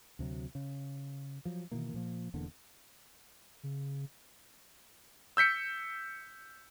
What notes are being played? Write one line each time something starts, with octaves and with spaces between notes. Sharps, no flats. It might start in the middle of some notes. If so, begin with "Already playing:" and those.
D2 C3 F#3
C#3
F3 F#3
B2 D#3 E3 A#3
A#2 F3 A#3
E1 E2 D3 A#3
C#3
E6 G6 B6 C#7